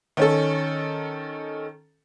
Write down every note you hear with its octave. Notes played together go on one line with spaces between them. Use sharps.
D#3 C#4 A4